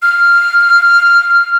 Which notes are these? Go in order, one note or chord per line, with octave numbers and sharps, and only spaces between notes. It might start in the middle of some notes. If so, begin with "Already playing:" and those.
F6